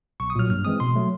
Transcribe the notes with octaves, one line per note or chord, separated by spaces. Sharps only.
B1 C#6
D#6
A#2 F#3 F6
G2 F6
E3 G#3 C4 D#6
B2 C6
F#3 A3